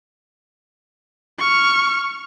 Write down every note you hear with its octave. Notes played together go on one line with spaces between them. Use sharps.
C#6 F6